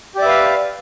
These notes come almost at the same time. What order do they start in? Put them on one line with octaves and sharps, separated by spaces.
G4 D5 E5 B4 F5